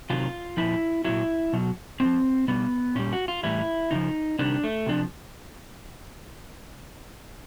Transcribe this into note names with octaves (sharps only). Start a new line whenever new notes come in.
C3 D#3 F#3 F4
A#2 F3 E4
A#2 F#3 E4
B2 F#3
A2 C4
F3
B2 G3 B3
A#2 G3 C#4
F#4
F4
A2 E3 G3 E4
C#3 F3 D#4
C3 D#3 G3 D4
A3
C3 F3 D4